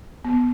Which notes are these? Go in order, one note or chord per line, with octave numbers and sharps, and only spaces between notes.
B3